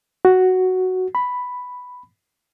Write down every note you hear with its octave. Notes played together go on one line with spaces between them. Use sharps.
F#4
B5